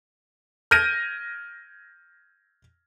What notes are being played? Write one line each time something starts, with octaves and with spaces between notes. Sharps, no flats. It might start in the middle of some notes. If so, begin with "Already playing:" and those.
F6 G6 G#6 A#6 D7 D#7